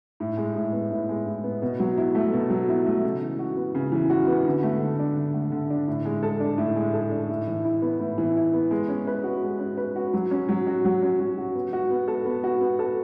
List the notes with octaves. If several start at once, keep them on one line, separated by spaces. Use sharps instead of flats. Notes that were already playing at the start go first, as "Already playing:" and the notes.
A2
G#3
A2
B3
A2
G#3
A2
B3
B2
F#3
E4
A3
B2
F#3
E4
A3
C#3
E3
F#4
B3
C#3
E3
F#4
B3
D3
A3
D3
D4
D3
A3
D3
D4
A2
G#3
A4
D4
A2
G#3
A4
D4
A2
E3
E4
B3
A2
E3
E4
B3
G#3
C#4
B4
F#4
G#3
C#4
B4
F#4
F#3
C#4
F#3
F#4
F#3
C#4
F#3
F#4
B3
F#4
B3
A4
B3
F#4
B3
A4